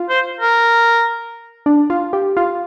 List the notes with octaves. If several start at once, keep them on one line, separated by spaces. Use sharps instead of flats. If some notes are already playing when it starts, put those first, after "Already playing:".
Already playing: F4
C5
A#4
D4
F4
G4
F4